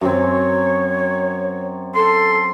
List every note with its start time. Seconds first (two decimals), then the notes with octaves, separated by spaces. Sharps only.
0.01 F#2 C4 C#5
1.95 A4 C6